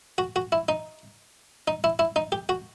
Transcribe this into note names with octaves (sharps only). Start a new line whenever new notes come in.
F#4
F#4
E4
D#4
D#4
E4
E4
D#4
G4
F#4